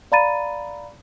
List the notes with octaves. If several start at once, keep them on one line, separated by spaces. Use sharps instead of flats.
D5 F5 A#5 B5 A6 D#7